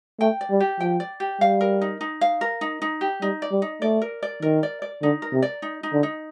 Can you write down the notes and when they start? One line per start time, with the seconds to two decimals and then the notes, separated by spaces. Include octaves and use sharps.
0.20 A3 G5
0.41 D5
0.50 G3
0.60 G4
0.80 F3 G5
1.00 D5
1.20 G4
1.41 G3 F5
1.61 A#4
1.81 D#4
2.01 D#4
2.21 F5
2.41 A#4
2.61 D#4
2.82 D#4
3.01 G4
3.22 G3 D#4
3.42 D5
3.52 G3
3.62 D#4
3.82 A3 D5
4.01 A#4
4.23 D5
4.42 D#3 A#4
4.63 D5
4.82 D5
5.03 D3 D#4
5.22 A#4
5.33 C3
5.42 D5
5.62 D#4
5.83 D#4
5.93 D3
6.03 D#4